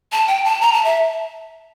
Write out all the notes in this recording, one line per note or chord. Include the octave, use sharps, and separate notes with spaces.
A5
G5
A5
A#5
A5
E5